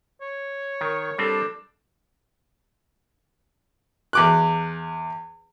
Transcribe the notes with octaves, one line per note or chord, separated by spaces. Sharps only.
C#5
D#3 A#4
G3 C4 D4 A4
E2 D6 F#6